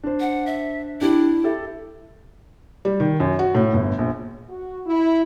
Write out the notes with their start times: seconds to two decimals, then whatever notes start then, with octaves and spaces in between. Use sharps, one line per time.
0.03 D4 C5
0.20 F#5
0.46 E5
1.01 D4 E4 G4
1.44 G4 A4 E5
2.85 G3
3.00 D#3
3.20 F#2
3.39 F#4
3.55 A2
3.74 G1
3.98 A#1
4.49 F#4
4.86 E4